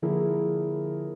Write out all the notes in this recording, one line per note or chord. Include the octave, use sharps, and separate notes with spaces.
D3 F3 A#3 E4 G#4 A#4